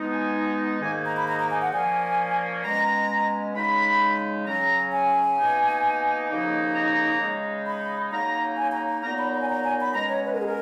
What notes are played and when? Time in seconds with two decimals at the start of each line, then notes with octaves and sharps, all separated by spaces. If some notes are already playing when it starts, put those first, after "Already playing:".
Already playing: B2 G#3 B3 D#4
0.13 G#5
0.81 G#2 D#3 A#3 D#4 G#5
1.04 A#5
1.15 B5
1.27 A#5
1.38 A#5
1.50 G#5
1.60 F#5
1.72 A#2 F3 A#3 C#4 G#5
2.63 B2 G#3 C#4 A#5
3.54 C#3 G#3 D#4 B5
4.46 C#3 F#3 C#4 A#5
4.91 G#5
5.37 B2 A#3 D#4
6.29 D#2 C#3 F3 A#3 D#4
6.74 A#5
7.19 C#3 G#3 D#4
7.65 B5
8.11 C#3 F#3 A#3 D#4 A#5
8.57 G#5
8.71 A#5
8.87 A#5
9.02 A#2 F#3 B3 D#4 A#5
9.18 B5
9.32 A#5
9.41 G#5
9.48 A#5
9.63 G#5
9.78 B5
9.94 B2 G#3 C#4 A#5
10.09 C#5
10.23 B4
10.32 A#4
10.39 G#4
10.46 A#4